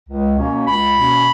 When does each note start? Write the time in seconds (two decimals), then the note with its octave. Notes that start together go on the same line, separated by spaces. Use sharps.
0.08 C#2
0.38 B2 A#3 C#4
0.67 C#2 B5
0.97 B2 A#3 C#4